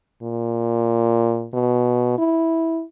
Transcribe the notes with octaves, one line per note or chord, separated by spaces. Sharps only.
A#2
B2
E4